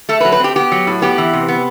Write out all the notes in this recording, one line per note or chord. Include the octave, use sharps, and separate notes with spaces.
A3 A4
B4
F#3
B4
C4 G4
B3 G4
F#3
A2
B3 G4
E3
C3
B3